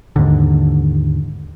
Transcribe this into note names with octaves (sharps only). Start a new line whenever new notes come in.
D#2 G#2 D3